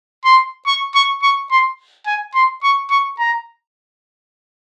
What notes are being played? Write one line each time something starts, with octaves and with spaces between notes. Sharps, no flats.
C6
C#6
C#6
C#6
C6
G#5
C6
C#6
C#6
A#5